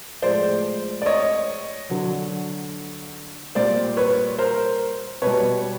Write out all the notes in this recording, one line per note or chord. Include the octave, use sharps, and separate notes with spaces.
A2 F3 G#3 C5 D5
D5
C#5 D#5
D3 F#3
A#2 G3 C5 D5
B4 C#5
A#4 C5
B2 G3 B4 C#5